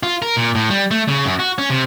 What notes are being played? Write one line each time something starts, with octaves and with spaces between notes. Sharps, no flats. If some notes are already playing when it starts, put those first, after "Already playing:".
F4
A#4
A#2
A2
G3
A3
C#3
F#2
F#4
C#4
C3